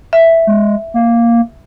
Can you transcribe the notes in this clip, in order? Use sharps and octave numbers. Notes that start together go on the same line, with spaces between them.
E5
G#3
A#3